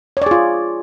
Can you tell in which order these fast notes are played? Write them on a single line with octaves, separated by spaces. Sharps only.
C#5 D5 G#4 F4